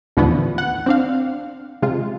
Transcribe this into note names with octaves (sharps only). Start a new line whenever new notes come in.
D#2 A2 D3 E3 F3 B3
F#5
C4 D4 F5
C3 G#3 F4